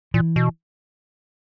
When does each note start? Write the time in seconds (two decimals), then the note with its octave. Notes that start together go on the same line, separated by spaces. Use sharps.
0.14 A#2 E3
0.36 B2